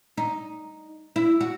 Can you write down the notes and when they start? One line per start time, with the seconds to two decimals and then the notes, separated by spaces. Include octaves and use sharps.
0.17 D#4
1.16 E4
1.41 F#4